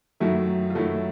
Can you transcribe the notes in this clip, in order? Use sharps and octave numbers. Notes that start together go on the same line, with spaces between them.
F#2 D#3 F#3 A3 E4
F4
F#2 D#3 F#3 A3 E4